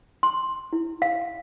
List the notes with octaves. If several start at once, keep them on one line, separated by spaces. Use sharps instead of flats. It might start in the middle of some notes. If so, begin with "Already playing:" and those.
C6
E4
F5